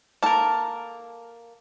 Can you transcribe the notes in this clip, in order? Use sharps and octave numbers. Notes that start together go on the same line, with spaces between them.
A#3 A4 A#4 A5